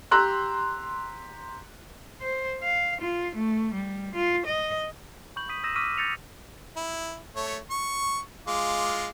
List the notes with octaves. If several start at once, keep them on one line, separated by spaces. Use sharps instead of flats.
G4 A#5 C6 E6 F#6
C5
F5
F4
A3
G3
F4
D#5
B5 C#6 G6 F#7
D#6 B6 D#7
D#6 E6 G6 A#6 D#7 E7
C#6 D6 E6 F6 B6 D#7
G6 A6 A#6 C#7 F7
E4
A3 C#5
C#6
G#3 F4 D6